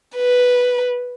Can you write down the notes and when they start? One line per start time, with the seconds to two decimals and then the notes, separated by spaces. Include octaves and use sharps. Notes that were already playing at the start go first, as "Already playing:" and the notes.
0.16 B4